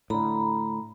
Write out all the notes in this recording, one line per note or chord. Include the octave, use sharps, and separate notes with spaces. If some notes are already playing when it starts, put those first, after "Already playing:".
A2 D3 A#5 B5